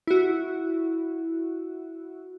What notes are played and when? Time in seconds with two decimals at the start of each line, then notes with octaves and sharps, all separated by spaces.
0.07 E4 F#4